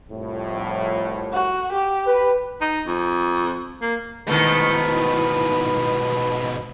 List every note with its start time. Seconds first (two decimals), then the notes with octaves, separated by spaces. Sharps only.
0.10 C2 F2 A2
1.32 F#4
1.72 G4
2.06 B4
2.61 D#4
2.87 F2
3.82 A#3
4.28 G#2 B2 D#3 A3 E4 B4